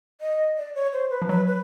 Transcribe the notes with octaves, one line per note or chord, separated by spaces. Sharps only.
D#5
D5
C#5
C5
B4
F3
F#3 B4
B4